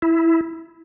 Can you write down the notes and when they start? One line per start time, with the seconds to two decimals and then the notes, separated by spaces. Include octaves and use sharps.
0.02 E4